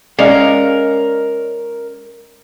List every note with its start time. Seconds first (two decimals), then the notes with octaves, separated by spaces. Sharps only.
0.19 G#3 C#4 G#4 A#4 D5 D#5 F5